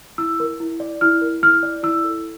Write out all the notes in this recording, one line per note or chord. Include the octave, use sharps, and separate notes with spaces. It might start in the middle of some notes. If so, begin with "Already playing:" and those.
E4 E6
A#4
E4
D5
E4 F6
A#4
E4 F6
D5
E4 E6
A4